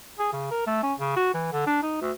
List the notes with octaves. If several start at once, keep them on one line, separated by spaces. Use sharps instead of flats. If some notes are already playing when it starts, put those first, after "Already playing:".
G#4
C#3
A#4
A3
C#4
C#3
F#4
E3
D3
D4
D#4
D2